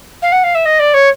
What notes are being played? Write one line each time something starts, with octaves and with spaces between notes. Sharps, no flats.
F5
F#5
F5
E5
D#5
D5
C#5